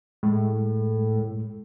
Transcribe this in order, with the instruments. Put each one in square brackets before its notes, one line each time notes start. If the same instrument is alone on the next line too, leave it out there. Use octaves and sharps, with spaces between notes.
[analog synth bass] A2 [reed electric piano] G#3